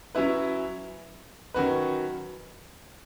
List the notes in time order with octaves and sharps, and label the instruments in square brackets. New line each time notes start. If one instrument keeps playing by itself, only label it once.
[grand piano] F#3 C#4 E4 B4
D#3 F#3 C#4 F#4 B4